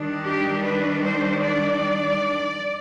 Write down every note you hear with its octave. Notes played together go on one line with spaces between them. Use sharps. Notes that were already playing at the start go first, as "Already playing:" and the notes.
Already playing: D#3 G3 D4
G4
B4
C5
D5